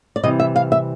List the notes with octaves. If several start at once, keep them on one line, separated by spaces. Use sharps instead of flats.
D5
C3 E3 G3 D#5
E5
F5
E5